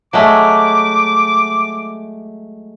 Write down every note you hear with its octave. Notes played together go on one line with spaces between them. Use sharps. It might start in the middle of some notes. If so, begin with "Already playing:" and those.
F#3 G#3 A3 D6